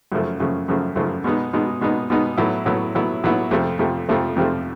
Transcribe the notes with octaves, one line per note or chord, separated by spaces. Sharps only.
F#2 C#3 F3 A3
F#2 C#3 F3 A3
F#2 C#3 F3 A3
F#2 C#3 F3 A3
B2 G#3 B3 D#4
B2 G#3 B3 D#4
B2 G#3 B3 D#4
B2 G#3 B3 D#4
A2 F#3 B3 E4
A2 F#3 B3 E4
A2 F#3 B3 E4
A2 F#3 B3 E4
F2 C3 F3 A3
F2 C3 F3 A3
F2 C3 F3 A3
F2 C3 F3 A3